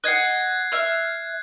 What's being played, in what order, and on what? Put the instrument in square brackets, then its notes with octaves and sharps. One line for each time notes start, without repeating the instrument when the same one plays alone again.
[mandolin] D#5 F#5 [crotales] F#6 G#6 C7
[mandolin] E5 F6